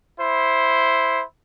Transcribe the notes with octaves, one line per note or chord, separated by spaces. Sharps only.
E4 C5